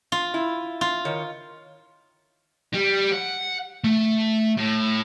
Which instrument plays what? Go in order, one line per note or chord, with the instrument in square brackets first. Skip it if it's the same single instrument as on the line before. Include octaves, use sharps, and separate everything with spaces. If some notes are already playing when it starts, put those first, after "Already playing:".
[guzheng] F4
[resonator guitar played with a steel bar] E4
[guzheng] F4
[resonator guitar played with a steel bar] D#3 C#5
[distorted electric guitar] G3
F#5
A3
A2